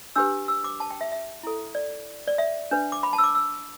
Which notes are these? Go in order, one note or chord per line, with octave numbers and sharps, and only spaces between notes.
D4 G4 B4 E6
E6
D6
A5
G5
E5
E5
E4 A4
D5
D5
E5
D4 B4
D6
B5
A5
E6
D6
E6